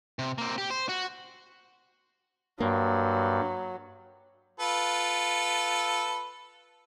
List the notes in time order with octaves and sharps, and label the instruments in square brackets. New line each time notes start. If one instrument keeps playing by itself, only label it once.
[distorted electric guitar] C3
A#3 C4
G4
C5
F#4
[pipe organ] G2 [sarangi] F#3 [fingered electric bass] A#3
[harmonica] F4 A4 B4